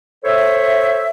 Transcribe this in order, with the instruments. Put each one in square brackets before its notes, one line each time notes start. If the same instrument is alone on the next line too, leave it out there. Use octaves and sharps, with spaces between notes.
[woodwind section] A4 C5 C#5 E5